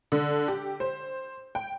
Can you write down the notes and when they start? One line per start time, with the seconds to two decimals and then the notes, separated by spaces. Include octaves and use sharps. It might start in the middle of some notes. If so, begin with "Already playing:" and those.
0.12 D3
0.48 G4
0.80 C5
1.55 G5